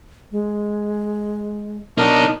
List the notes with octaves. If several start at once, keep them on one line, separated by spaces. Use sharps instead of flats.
G#3
B2 D4 D#4 A#4